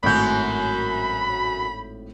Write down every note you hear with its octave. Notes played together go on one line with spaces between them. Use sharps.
G#1 F#2 A2 F#3 B5 G6